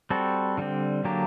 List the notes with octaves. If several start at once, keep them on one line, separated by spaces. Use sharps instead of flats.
G3 C4 F#4 A4
D3 G3 C4
D3 F#3 A#3 D4 G4